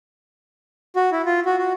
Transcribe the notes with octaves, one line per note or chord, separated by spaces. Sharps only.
F#4
E4
F4
F#4
F#4